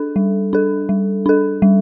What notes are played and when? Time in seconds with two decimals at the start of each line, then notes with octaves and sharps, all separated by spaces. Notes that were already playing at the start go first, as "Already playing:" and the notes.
Already playing: D4 A4
0.16 G3
0.53 D4 A4
0.89 G3
1.26 D4 A4
1.62 G3